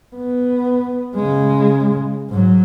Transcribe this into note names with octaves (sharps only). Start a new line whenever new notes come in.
B3
C#3 G#3
G#2 F#3